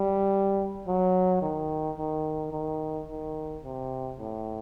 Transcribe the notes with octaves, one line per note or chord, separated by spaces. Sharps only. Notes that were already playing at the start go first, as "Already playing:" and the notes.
Already playing: G3
F#3
D#3
D#3
D#3
D#3
C3
A2